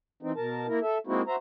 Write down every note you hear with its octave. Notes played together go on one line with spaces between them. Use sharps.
E3 C4 D#4
B2 A#4 A5
A#3 E4 A#4
A4 E5
G#3 A#3 C4 D#4 E4 F#4
F#4 C5 E5 A#5